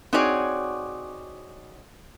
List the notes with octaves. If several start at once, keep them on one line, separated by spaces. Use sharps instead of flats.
C4 D#4 F#4 G#4 C#5 D5